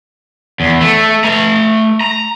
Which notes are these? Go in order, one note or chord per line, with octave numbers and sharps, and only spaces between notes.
E2
A3
A3 A#5
A#5